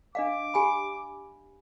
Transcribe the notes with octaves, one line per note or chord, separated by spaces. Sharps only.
D4 D#5 F5 D6
G4 G#5 B5